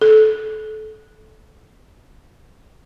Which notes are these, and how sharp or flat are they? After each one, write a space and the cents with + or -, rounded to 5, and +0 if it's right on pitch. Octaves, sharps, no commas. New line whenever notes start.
A4 -25